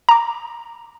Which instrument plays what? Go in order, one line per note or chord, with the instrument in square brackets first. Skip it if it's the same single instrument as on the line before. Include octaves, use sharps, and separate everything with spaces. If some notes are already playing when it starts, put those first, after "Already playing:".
[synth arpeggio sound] A#5 D6